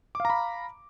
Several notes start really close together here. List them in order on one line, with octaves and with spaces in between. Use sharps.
D6 F5 A#5 B5